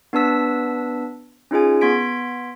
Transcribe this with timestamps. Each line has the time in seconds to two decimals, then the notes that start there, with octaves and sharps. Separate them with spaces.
0.13 B3 D4 B4 A5 E6 B6
1.51 C#4 D#4 F4 G#4 G#5
1.81 B3 C6 G#6 B6 D7